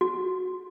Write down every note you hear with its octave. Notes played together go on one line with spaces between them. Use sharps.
F#4